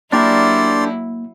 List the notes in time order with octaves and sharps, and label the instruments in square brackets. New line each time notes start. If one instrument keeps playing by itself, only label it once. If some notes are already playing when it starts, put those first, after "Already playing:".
[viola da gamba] F#3 E4 [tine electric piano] A#3 [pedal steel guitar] D4 G4 A#4 [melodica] D5 C6